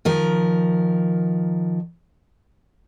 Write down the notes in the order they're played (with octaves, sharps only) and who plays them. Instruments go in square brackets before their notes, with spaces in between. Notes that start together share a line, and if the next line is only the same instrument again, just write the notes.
[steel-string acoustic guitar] D#3 F3 A#4